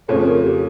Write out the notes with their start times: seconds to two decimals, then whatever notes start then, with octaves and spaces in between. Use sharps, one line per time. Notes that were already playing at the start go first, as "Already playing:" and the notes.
0.08 F2 C#3 F3 A3 C#5
0.26 A#4
0.43 G4